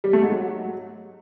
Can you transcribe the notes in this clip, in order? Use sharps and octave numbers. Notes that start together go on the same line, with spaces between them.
G3
A3
G#2
F#3